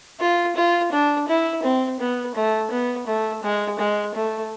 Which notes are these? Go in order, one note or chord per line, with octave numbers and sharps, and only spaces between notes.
F4
F4
D4
E4
C4
B3
A3
B3
A3
G#3
G#3
A3